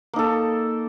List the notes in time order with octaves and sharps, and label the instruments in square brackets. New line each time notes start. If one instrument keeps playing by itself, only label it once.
[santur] A#3
D#4
A4